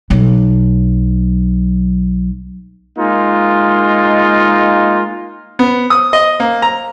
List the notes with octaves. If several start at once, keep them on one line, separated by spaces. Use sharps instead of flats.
B1 F#3
G#3 A#3 D#4 F4
B3
D#6
D#5
A#3
A#5